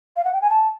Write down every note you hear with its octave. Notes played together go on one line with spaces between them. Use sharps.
F5
F#5
G5
G#5
A5